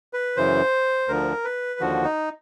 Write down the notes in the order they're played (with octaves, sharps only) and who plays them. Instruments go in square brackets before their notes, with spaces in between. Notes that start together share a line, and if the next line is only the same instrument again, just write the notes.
[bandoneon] B4
F#2 C#3 E3 C5
D2 D3 F3 A#4
B4
D#2 D3 F3 F#4
D#4